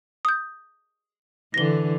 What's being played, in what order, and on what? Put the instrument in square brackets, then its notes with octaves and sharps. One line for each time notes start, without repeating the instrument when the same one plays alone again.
[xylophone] D#6 G6
[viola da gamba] D3 E3 [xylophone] A#6 G7